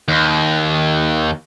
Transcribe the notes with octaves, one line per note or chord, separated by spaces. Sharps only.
D#2